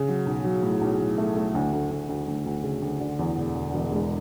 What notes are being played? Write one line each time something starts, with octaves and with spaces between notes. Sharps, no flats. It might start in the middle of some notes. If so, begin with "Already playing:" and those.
Already playing: C#3
F#3
B1
F#3
A2
B1
A2
A3
A3
D2
D2
D2
D2
D2
D2
C#3
D2
D3
E2
E1
D3
E1
G#3